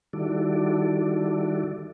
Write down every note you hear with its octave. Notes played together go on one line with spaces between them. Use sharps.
D#3 G3 E4 F#4 A4 D5